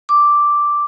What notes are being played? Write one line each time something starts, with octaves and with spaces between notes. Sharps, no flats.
D6